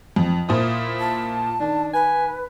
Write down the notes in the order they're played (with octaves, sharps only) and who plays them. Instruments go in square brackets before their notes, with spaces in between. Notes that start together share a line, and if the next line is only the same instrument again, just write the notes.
[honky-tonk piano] F2
[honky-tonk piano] A#2 C5 D#6 [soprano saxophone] E4
[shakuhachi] A5
[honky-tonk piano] D#3 [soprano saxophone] D4
[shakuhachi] B4 [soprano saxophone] G#5